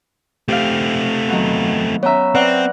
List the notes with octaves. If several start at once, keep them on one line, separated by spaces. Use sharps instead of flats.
A3 C4 G4 F5
D#3 F#3 B3
B3 C#4 C#5 E5 A#5
C4 B4 D5 F#5 A#5 F#6